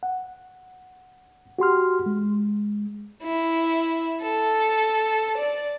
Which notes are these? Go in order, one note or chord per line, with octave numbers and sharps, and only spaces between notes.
F#5
F#4 G4 C6 F6
G#3
E4
A4
D5